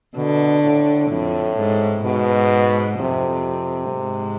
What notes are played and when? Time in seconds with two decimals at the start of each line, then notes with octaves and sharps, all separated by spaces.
0.16 B2 D3
0.63 A2
1.11 F2 A2
1.58 G#2
2.05 G#2 B2
3.00 F2 C3
3.95 G#2